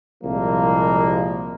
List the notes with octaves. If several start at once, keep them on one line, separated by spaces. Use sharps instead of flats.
C2 A#2 F3 G3 G#3 A#3